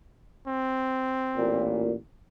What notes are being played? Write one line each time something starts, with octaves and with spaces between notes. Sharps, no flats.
C4
A1 A#2